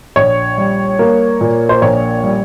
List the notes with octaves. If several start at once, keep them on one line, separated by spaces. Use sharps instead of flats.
A#1 C#5
G3
A#3
A#2
C5
A#1 C#5
G3